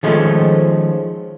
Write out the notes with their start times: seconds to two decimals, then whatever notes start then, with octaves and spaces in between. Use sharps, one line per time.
0.03 D#3 F3 G#3 A3 C#4 F4